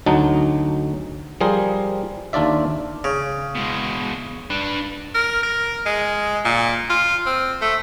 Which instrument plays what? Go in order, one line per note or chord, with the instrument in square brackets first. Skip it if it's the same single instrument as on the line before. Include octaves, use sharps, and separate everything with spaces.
[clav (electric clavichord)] D2 F#3 D#4 A5
F3 G3 G#4 A#4 C5
D#2 D4 F4 D5 E5
[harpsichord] C#3
[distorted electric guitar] B2 G#3
D4 B4
[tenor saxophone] A#4
A#4
G#3
A#2
F4
C4
A3